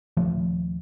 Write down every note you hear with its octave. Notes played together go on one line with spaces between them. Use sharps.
D#1 F3 A3 C#4